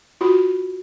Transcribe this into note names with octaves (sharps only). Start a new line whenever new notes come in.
F4 F#4 B5